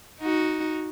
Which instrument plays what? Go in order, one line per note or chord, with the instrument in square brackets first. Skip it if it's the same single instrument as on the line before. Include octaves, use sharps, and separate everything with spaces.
[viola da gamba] D#4 F#4